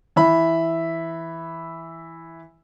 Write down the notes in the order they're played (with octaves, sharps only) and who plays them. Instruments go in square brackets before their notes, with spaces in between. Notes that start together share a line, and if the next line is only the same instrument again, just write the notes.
[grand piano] E3 E5 B5